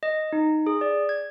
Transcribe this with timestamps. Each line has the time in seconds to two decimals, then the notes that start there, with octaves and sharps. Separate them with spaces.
0.03 D#5
0.33 D#4
0.67 G#4
0.81 D5
1.09 G#6